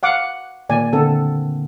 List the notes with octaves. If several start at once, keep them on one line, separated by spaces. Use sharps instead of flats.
F5 F#5 D6
A#2 D#3 A#3 D5 G#5
D3 C4 A4 F#5